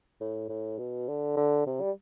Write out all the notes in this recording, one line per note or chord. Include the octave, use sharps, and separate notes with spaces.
A2
A2
B2
D3
D3
C3
G3